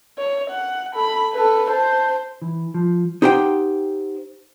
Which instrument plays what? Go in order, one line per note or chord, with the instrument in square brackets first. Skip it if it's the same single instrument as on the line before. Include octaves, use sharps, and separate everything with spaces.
[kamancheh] C#5
F#5
A4 B5
A4 B4
C5 A5
[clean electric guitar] E3
F3
[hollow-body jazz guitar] D#4 G4 C5 F#5 G5